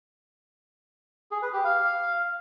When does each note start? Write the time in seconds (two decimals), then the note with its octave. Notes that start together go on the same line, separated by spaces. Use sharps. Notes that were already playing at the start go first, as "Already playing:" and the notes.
1.31 G#4
1.42 B4
1.53 G4
1.64 F5